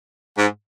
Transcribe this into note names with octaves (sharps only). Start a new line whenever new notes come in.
G#2